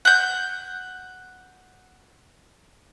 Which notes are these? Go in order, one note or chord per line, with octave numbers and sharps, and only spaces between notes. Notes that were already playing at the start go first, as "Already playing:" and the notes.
F#5 G6